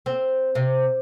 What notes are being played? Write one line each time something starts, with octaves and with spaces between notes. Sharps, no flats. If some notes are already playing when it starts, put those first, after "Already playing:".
C4
C3